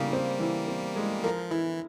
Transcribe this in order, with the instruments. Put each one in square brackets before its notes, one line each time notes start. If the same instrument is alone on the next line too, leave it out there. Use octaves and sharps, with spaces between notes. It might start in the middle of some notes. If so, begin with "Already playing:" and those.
Already playing: [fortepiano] C#3 [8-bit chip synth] G3 A#3
[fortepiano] C4
E3
C4
G#3
[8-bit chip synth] F3 [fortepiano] A#4
[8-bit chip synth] E3 [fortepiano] E4